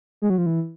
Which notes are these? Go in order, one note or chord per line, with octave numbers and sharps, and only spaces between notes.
G#3
F#3
F3
E3